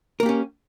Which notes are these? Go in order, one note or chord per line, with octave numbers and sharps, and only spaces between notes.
A#3 C#4 G4 A#4